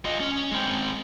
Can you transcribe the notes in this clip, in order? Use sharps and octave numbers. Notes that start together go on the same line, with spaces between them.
F4 D#5
C#4
G#3 C4